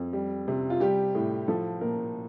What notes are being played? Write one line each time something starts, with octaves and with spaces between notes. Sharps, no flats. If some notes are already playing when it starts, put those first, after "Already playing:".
Already playing: F2
G3
C3
F4
G3 G4
A2
F3 A4
A#2 A#4